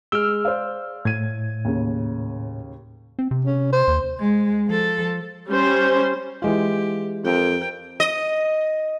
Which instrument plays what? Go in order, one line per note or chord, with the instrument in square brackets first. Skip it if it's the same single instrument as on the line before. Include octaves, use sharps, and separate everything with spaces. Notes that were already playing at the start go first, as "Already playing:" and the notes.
[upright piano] G#3 D7 G7 [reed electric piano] E6 F6
[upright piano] C5 D5 F5
[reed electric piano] A2 [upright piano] G#6 D#7
[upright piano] D#2 C#3
[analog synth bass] C4
C3
[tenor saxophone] C#4
C5
[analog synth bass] D#2
[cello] G#3
F3 A4
[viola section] G3 C#4 C5
[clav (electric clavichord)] E3 G#3 F4 [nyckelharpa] G4
[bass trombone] F2 [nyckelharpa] A#4 G5
[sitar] D#5